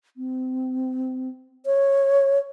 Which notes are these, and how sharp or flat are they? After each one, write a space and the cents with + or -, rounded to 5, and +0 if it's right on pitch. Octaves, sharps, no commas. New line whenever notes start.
C4 -25
C#5 -10